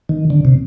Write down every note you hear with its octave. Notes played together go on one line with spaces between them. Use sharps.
D#3
D3
C3